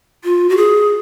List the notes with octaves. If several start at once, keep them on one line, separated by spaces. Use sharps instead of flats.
F4
F#4
G#4